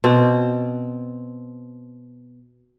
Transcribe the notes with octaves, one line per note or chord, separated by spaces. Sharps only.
B2 C4